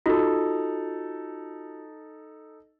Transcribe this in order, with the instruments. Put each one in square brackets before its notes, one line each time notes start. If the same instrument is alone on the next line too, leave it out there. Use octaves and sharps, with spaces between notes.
[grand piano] D#4 A4 [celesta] F4 F#4